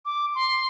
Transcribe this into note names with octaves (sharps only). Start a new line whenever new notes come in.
D6
C6